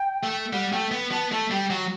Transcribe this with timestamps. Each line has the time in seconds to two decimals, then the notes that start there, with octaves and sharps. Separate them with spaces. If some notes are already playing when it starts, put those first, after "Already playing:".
Already playing: G5
0.23 A3
0.53 G3 F#5
0.72 A3 G5
0.91 B3
1.11 B3 A5
1.32 A3 A5
1.51 G3 G5
1.70 F#3 F#5